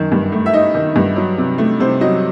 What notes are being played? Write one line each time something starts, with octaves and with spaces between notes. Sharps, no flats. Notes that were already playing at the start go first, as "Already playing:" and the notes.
Already playing: F#2 D#3
G2
A3
E5
D#4 D#5
D#3
G2
F#3
C3
A3
C3 C5
F#3 D#5